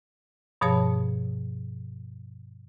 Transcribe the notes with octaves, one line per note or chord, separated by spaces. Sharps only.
G2 B2 F3 G#4 C#5 A5